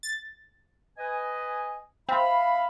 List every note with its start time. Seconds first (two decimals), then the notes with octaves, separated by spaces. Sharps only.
0.03 A6
0.98 B4 D#5 G#5
2.09 C4 E5 F5 B5